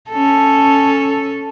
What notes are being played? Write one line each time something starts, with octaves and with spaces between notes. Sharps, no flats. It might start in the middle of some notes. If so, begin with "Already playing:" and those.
C#4 A4